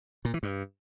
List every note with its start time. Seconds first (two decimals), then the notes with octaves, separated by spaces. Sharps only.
0.25 A#2
0.34 E3
0.43 G2